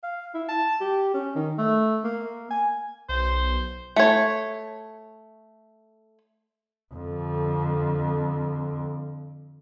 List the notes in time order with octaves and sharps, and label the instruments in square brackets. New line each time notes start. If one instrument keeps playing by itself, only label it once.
[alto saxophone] F5
E4
A5
G4
C#4
D#3
A3
A#3
G#5
[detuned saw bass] B1 [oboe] C5
[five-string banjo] A3 C#5
[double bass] F2 D3